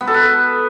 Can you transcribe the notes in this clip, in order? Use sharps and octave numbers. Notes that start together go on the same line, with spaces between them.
B3
A4
B4